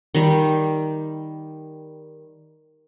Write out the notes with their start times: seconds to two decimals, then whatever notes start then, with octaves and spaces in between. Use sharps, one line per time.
0.15 D#3 G3